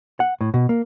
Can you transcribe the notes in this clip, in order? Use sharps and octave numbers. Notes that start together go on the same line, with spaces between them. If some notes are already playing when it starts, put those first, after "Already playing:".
F#5
A2
B2
A#3